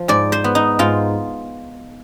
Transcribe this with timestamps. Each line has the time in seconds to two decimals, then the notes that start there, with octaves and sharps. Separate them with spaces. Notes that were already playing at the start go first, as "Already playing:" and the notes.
Already playing: F3
0.08 G#2 D5
0.32 C5
0.44 B3
0.55 D#4
0.79 G#2 F4